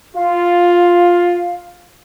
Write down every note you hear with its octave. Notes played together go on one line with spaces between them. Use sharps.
F4 F5